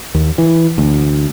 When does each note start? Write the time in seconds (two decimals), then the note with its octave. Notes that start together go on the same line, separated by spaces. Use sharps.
0.15 D#2
0.38 E3
0.78 D2